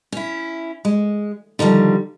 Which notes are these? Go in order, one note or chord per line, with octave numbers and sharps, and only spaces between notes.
C#4 E4
G#3
D3 D#3 F3 G3